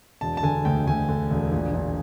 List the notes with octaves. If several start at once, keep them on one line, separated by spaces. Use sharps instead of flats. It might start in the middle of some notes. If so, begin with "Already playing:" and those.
E1 A5
A5
D3 G#5
D2 G5
D2 G#5
D3
E1
A#1
A#1